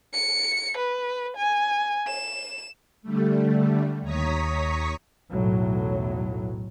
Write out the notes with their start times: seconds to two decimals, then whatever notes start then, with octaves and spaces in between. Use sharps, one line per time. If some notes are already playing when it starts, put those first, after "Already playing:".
0.13 C#7
0.77 B4
1.37 G#5
2.07 E7
3.02 D3 G3 A3
4.01 D#2 C#5 A#5 C#6 D#6 B6
5.31 B1 E2 A2 F#3